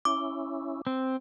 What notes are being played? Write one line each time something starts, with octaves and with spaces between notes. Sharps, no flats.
C#4 E4 D6
C4